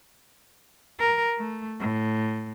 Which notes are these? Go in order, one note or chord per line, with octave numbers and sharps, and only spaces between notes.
A#4
A3
A2